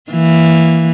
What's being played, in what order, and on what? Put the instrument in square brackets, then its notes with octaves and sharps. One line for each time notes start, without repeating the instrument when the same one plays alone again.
[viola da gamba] E3 A#3